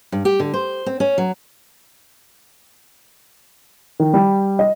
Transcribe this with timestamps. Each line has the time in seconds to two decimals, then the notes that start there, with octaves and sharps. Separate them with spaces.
0.12 G2
0.25 G4
0.40 D3
0.54 C5
0.86 C4
1.00 C#4
1.18 F#3
4.00 D#3
4.14 G3
4.59 D#5